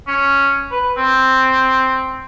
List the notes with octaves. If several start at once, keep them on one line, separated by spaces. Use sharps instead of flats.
C#4
B4
C4